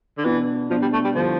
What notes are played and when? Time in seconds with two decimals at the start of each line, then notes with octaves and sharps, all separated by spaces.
0.18 D3
0.25 B2 E3 B3 D4
0.70 B2 F3 B3 D4
0.82 G3
0.93 A3
1.04 G3
1.15 D3 F3 G3 B3 E4